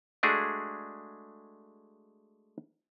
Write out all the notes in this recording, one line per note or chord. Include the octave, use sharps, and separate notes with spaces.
G#3 A3 D4 F#4 G#4